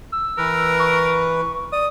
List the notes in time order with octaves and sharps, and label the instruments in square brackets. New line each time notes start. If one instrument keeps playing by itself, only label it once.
[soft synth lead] E6
[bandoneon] E3 B4 [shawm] A#4
[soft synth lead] C#6
[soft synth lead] D5 [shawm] D#6